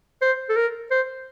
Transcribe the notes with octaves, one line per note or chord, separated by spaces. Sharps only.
C5
A4
A#4
C5